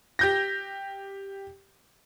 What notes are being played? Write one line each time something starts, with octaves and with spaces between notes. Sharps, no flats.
G4 G6 A#6